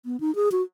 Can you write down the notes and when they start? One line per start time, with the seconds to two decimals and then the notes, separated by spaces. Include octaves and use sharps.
0.05 B3
0.20 D#4
0.35 G#4
0.52 F#4